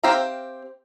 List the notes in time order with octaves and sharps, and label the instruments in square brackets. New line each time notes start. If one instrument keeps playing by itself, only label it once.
[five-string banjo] C4 G4 E5 F5 A#5